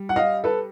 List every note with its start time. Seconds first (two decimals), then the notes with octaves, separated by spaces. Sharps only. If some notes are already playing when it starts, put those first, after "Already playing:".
Already playing: G3
0.09 F#5
0.16 D#5 F5
0.44 A4 B4